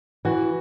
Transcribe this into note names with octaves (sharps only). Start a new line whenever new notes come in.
E3 F#4